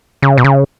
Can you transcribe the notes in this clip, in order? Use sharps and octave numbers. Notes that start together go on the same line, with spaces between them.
C#3
B2
C#3